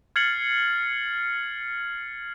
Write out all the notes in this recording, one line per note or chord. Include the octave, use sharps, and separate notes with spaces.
F6 G#6 A6 C7 C#7 F#7